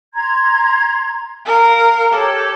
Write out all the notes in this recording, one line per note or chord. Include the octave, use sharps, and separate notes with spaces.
A#5 C6 G#6
A#4 F5
G4 A4 C#5 D6